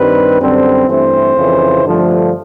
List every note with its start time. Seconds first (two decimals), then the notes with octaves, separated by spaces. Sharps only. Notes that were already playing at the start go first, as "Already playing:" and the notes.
Already playing: G2 D#3 G3 C4 B4
0.40 F#2 D3 G3 C4
0.88 G2 E3 A3 C4 C5
1.36 F2 C#3 E3
1.85 G2 D3 F3 A3